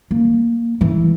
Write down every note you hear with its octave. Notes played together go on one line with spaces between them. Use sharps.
A#3
E3